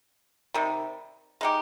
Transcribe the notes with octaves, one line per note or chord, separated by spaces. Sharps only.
C3 D#3 G3
G#3 D#4 G4